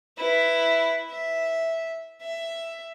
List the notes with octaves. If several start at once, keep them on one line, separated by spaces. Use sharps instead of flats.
E4 B4
E5
E5